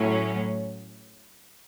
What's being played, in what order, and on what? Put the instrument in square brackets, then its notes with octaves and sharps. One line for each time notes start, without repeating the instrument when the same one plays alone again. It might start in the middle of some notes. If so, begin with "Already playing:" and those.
Already playing: [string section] A2 F#3 C#4